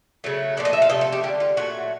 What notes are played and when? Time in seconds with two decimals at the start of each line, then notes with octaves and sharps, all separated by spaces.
0.24 C#3 F#3 A3
0.57 A#2 F3 A3 D5
0.65 D#5
0.73 E5
0.82 F5
0.90 C3 F3 A3 D#5
1.01 A4
1.12 G4
1.23 D3 G3 G4
1.40 F4
1.57 A#2 F#3 A3 F#4